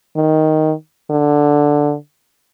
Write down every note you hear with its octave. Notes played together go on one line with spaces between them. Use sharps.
D#3
D3